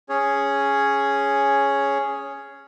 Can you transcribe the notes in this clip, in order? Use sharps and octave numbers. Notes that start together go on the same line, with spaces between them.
C#4 G#4 C#5